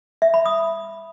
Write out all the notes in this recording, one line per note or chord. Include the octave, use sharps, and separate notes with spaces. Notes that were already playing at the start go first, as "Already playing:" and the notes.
E5
B5
D#6